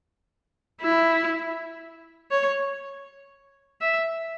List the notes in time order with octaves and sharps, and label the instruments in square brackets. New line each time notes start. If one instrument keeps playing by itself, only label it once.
[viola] E4
C#5
E5